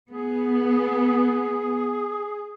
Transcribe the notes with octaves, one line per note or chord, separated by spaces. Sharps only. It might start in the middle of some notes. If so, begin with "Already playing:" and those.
B3 G#4